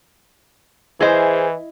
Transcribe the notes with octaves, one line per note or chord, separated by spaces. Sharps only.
E3 E4 G#4 C5 D#5 E5